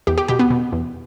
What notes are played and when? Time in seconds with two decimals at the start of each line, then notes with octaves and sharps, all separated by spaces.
0.07 E2 G4
0.18 G4
0.28 B2 G4
0.39 B3
0.50 B2
0.72 E2